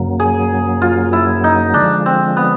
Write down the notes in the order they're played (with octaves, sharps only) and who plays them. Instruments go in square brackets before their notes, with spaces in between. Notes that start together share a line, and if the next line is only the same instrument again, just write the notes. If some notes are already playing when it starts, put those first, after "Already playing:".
Already playing: [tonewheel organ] F#2 C#3 F#3 A#3
[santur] G#4
F4
E4
D#4
[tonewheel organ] D3 F3 G#3 [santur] D4
[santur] C4
B3